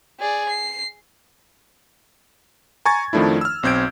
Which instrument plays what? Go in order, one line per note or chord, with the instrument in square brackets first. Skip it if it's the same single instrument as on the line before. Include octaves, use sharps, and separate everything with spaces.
[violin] G#4 D5
C7
[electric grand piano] G#5 A#5 C#6 G#6 A6
F2 D#3 F3 A3 D4 E4
E6 F6
B1 C4 G6 G#6 D7